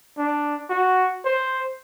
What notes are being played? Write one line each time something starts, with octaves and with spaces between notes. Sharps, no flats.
D4
F#4
C5